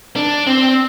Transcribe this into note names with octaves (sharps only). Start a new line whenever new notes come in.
D4
C4